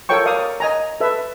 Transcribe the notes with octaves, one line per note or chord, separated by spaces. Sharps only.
F4 A4 A#4 C#5 G5 C#6
A#4 D5 F5 D#6
D#5 G#5 A#5
A4 B4 E5